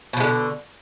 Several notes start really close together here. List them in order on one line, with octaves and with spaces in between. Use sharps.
B2 F3 G#3 D3